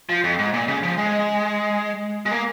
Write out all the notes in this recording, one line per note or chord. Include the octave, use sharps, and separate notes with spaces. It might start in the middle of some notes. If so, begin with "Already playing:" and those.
F3
F2
G#2
A#2
C#3
F3
G#3
G#3
A#3